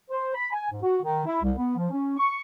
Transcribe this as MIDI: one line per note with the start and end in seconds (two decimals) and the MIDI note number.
0.09 0.32 72
0.35 0.50 83
0.52 0.69 80
0.70 0.79 44
0.82 0.97 66
1.02 1.20 51
1.25 1.39 64
1.41 1.51 36
1.56 1.75 59
1.76 1.88 53
1.90 2.16 61
2.17 2.41 85